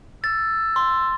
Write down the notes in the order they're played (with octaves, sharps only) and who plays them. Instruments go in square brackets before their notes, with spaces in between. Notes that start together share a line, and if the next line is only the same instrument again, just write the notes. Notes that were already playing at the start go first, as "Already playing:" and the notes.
[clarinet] E6 [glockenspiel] A6
[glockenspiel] C6